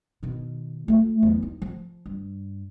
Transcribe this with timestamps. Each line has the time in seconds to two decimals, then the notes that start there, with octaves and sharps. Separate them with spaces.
0.23 B2 D#3
0.88 A3 F4
1.23 E2 F#3
1.42 D#4
1.62 F3
2.06 G2